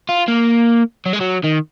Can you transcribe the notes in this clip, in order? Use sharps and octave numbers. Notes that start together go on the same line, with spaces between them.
F4
A#3
F#3
G#3
F#3
D#3